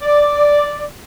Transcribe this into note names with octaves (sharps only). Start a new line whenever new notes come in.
D5